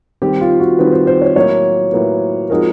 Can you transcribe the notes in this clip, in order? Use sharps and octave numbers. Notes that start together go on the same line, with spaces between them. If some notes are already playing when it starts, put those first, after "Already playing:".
D#3 G3 C4 G4
F4
F#4
D#3 G3 C4 B4
C5
C5
C#5
A2 F#3 A#3 C#5
A2 F#3 A#3 B4
F3 G#3 C4 D#4 F#4 A#4